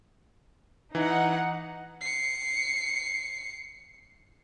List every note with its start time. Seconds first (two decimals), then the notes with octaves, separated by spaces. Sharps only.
0.95 E3 D#4 F#5
2.01 C7 C#7